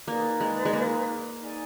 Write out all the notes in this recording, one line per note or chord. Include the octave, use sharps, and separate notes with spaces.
A#3 D#4 G#4 B4 D5
G#3
G#3
A#3
D#4 G#4 D5 G#5